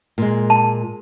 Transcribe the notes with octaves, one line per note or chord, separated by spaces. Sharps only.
A#2 G#3
A5